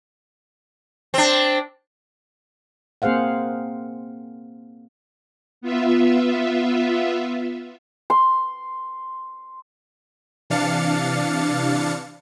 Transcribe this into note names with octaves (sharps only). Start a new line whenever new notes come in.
C4 D4
A#3 C4 G#4 C5 F5 F#5
B3 F4 E5
C6
C3 E3 D4 F5 A6 C#7